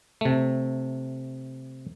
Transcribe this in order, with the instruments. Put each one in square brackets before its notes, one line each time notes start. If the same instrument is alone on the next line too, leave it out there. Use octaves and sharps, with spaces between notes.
[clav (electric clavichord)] C3 A3